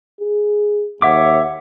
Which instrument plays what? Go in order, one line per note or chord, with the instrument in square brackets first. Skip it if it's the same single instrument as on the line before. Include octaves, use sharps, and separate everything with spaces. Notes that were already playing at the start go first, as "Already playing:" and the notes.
[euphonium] G#4
[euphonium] D#2 [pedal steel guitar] C#5 E5 D6 [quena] F#5